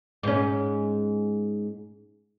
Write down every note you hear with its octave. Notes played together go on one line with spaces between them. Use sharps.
G#2 C#4